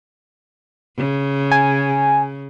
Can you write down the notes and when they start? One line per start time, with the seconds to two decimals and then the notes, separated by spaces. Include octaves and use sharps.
0.97 C#3
1.52 G#5